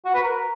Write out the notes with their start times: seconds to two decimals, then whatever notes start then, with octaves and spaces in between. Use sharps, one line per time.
0.05 F#4
0.14 B4
0.23 A#4